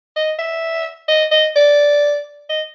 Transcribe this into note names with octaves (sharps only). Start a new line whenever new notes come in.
D#5
E5
D#5
D#5
D5
D#5